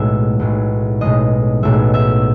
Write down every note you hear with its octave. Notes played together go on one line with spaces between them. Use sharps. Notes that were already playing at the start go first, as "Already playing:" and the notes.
Already playing: B1 A2 G#3 E5
B1 A2 G#3
B1 A2 G#3 D#5
B1 A2 G#3 E5
E5